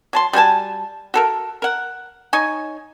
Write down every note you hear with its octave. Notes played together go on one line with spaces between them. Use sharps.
F#3 A5 C6
G3 F#4 G#5 A5
F#4 A4 A#4
A#4 F#5
D#4 C#5 G#5